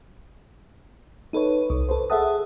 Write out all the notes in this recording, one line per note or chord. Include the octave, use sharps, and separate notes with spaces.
D#4 A4 B4 C#5
C2
A4 B4 C5
G#4 A4 E5 F#5 A5 D#6